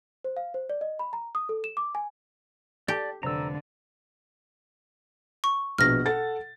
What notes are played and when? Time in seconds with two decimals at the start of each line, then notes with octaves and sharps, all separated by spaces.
0.24 C5
0.37 F5
0.54 C5
0.70 D5
0.81 D#5
0.99 B5
1.13 A#5
1.35 D#6
1.49 A4
1.64 E7
1.77 D6
1.95 G#5
2.88 G4 A4 D5 A5
3.23 F1 D3 C5 A#5 E6
5.44 C#6
5.78 A#1 B2 F6 A#6
6.06 A4 F#5 A6